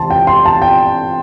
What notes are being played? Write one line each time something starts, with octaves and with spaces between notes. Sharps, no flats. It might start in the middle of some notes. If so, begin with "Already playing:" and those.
Already playing: C3 E3 A5 C6
G5
C6
A5
G5